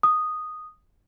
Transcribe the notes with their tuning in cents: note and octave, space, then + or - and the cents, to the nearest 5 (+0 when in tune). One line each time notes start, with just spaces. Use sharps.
D#6 -5